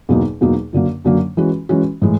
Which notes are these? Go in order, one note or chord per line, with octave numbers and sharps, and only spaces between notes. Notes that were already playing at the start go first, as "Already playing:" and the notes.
E2 B2 F#3 A#3 D#4
E2 B2 F#3 A#3 D#4
F#2 D3 F#3 A#3
F#2 D3 F#3 A#3
E3 G#3 C#4 F#4
E3 G#3 C#4 F#4
A2 E3 G#3